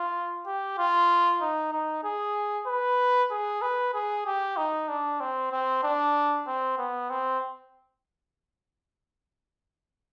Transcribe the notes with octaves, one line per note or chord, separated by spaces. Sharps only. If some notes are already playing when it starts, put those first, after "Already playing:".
Already playing: F4
G4
F4
D#4
D#4
G#4
B4
G#4
B4
G#4
G4
D#4
D4
C4
C4
D4
C4
B3
C4